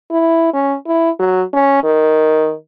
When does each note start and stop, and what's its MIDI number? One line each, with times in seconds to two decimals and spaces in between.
0.11 0.52 64
0.53 0.75 61
0.87 1.10 64
1.19 1.42 54
1.54 1.82 61
1.83 2.54 51